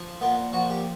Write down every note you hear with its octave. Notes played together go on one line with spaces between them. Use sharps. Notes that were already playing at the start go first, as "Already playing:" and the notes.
Already playing: F3
A#2 B3
F3 F#4
G4